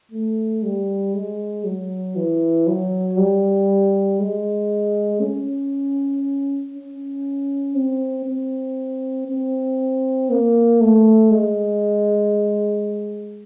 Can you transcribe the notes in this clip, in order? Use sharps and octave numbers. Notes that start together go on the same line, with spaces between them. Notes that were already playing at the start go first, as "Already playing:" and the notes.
A3
G3
G#3
F#3
E3
F#3
G3
G#3
C#4
C#4
C4
C4
C4
A#3
A3
G#3